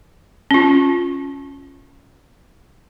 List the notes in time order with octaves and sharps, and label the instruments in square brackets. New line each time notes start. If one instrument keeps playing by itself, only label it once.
[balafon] C#4 F4